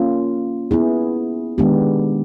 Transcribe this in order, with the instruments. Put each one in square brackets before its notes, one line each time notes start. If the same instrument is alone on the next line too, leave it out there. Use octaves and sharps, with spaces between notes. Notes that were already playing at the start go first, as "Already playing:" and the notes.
Already playing: [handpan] A#3 C#4 F4
B3 E4 G#4
D#3 G#3 B3 D4 G4